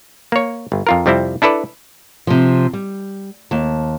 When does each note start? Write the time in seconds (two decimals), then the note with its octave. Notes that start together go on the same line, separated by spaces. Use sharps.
0.32 A#3 C#5
0.72 G1
0.87 F2 F4 A#4
1.06 F2 C3 G3 C4 E4
1.42 D4 E4 A4 B4 D5
2.27 C3 F3
2.73 G3
3.51 D#2 A5